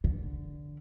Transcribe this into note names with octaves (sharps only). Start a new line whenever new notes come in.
D3